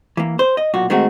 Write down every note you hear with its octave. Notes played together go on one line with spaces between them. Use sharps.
E3 A#3
C5
D#5
B1 A#2 F#4
D#3 G#3 A3 C4 F#4